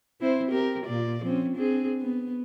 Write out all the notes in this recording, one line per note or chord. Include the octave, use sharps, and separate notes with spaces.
C4 E4 C5
C4 G4 A#4
A#2 F4 D5
F3 C4 C#4
C4 D4 G#4
B3